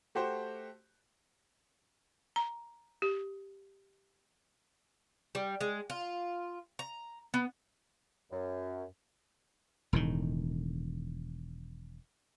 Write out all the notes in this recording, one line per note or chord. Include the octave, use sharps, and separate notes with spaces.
A3 F#4 G4 C5
A#5
G4
G3
G#3
F4
A#5
B3
F#2
E1 A2 D#3